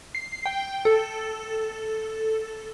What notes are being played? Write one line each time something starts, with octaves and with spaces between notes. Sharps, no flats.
C7
G5
A4